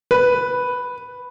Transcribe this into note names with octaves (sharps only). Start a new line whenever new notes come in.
B4